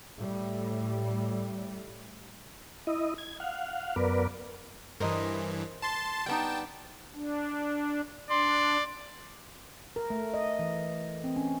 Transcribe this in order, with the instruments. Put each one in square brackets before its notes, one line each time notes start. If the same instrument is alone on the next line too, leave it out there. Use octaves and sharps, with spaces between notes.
[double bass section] A2 G3
[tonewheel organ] E4 D#5
G#6
F5 F#5
F#2 B3 A#4 B4 D5
[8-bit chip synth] G2 E3 [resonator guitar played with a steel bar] A#4 C5 D#5
[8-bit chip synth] A5 C6 A6
[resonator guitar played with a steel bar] G3 B3 D#4 [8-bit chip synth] G5 A5
[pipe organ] D4
[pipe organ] D4 [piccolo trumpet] D5 [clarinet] C6
[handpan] A#4
A3
D#5
E3
C4
C#4